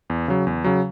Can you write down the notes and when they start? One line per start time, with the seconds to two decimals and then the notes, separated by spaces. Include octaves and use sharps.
0.10 E2
0.28 C#3 F#3
0.47 E2
0.64 C#3 F#3